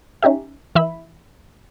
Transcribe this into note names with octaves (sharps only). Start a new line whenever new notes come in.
C#4 D#4 G4 E5
E3 E4 E5 B5